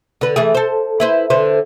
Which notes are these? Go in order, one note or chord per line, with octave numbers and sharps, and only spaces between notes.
D3 B4
E3 A3 G#4
A4 C5
E4 B4 C5
D3 B4 C5